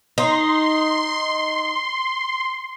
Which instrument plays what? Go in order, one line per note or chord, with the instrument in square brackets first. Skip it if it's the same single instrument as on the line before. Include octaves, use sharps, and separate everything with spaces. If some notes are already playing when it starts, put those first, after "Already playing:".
[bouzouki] D#4 [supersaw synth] C6